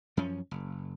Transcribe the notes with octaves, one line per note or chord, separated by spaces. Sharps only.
F#2 F3 C#4
F#1